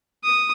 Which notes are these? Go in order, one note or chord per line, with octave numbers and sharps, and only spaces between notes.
D#6